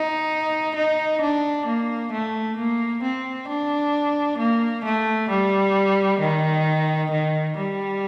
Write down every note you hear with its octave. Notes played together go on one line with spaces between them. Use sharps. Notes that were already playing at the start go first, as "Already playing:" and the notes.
Already playing: D#4
D#4
D4
A#3
A3
A#3
C4
D4
A#3
A3
G3
D#3
D#3
G3